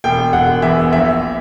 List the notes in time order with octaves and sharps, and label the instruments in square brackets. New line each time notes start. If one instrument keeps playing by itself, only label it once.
[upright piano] E1 G5
E1 F#5
E2 E5
A#1 E5